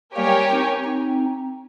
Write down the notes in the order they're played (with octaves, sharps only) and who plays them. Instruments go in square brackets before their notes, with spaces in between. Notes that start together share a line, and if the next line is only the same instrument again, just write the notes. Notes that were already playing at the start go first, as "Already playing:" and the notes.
[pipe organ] G3 A#3 [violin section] G4 A#4 C#5 G#5
[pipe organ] C4 D#4
C4 D#4